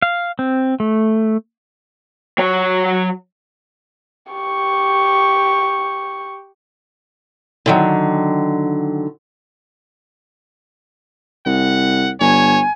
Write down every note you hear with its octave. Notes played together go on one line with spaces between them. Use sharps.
F5
C4
A3
F#3 C#5
G4 C#6
D3 D#3 F#3
C2 F#5
G1 C#5 G#5